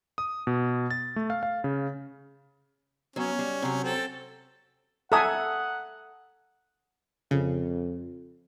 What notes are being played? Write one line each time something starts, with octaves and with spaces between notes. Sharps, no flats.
D#6
B2
A6
A3
F5
F5
C#3
F#3 B3 C#4
G3
C3 F#3
C4 A4
A4 E5 F#5 G#5 A#5 D#6
F2 C#3